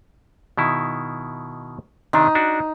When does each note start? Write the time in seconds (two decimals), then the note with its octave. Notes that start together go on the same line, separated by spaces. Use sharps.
0.58 B2 D#3 E4
2.13 C3 D#3 D4 D#4
2.35 D4 F#4